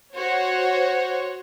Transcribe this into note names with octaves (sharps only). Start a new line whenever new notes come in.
F#4 C5 C#5